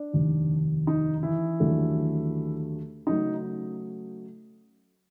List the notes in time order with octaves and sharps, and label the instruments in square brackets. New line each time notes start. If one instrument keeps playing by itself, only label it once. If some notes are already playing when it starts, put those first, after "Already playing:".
Already playing: [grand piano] D4
F1 D#2 D#3
D#4
E3 E4
D#2 D3 F#3 A3
C#3 F#3 A3 D#4